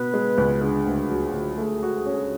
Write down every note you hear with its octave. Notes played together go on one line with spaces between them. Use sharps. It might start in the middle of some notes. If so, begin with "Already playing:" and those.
Already playing: B2 B3 B4
G#3
C#2
D3 G#4
D2
F#3
D2
A3 G#4
F#4
C#4